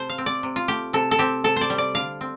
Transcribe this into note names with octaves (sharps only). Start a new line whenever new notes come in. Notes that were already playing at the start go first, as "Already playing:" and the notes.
Already playing: C3 A4 C5
F5
C4
D5
C3
F4
A3 G4
C3 A4
A4
C4 G4
C3 A4
C5 D5
G3
D5
D3 F5
C4